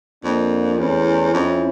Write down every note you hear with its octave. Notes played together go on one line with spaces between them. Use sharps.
F2 A#3 D4
E2 A3 C#4
F2 C#4 E4